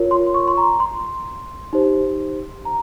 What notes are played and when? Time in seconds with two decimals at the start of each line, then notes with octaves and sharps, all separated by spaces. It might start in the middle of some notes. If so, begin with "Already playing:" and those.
Already playing: F4 A#4 C#5
0.11 C6
0.34 C#6
0.48 C6
0.57 A#5
0.80 C6
1.73 D#4 G4 C5
2.65 A#5